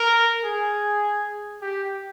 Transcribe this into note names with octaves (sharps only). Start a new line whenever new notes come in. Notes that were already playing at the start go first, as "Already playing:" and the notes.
Already playing: A#4
G#4
G4